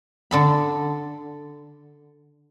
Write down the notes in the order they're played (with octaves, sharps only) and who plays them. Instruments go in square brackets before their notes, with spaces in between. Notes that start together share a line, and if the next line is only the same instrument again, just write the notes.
[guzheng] D3 A4 B5